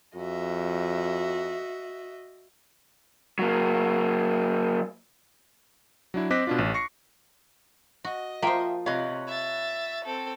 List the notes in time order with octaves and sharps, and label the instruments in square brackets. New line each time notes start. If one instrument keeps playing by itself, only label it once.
[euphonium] F2 [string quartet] F#4 D#5 E5
[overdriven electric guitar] F#3 A#3
[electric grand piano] F#3 D4 E4
C4 D#5 D6 F#6 A#6 B6
B2 D4 F4
A1
C#6 A#6 C7 C#7
[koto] F#4 [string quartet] D#5
[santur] F3 [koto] A#3 C5 [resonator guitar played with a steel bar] E5 G5
[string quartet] C3 [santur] C#5 F#5 B5 [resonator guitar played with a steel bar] D#5 F5
[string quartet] E5 A6
C4 A4